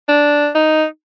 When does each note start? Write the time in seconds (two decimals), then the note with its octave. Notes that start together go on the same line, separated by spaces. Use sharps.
0.08 D4
0.55 D#4